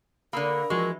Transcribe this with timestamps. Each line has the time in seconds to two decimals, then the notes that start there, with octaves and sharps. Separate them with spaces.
0.33 D3 A#3 A#4 F5 B5 D#6 E6
0.70 E3 F3 G#3 F#4 C#6